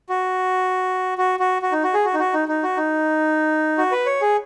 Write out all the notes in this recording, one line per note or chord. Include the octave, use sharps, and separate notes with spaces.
F#4
F#4
F#4
F#4
D#4
F#4
G#4
F#4
D#4
F#4
D#4
D#4
F#4
D#4
F#4
B4
C#5
G#4